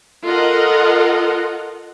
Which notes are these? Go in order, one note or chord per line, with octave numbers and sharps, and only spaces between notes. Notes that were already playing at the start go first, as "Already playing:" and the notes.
F4 A4 A#4 D#5 F#5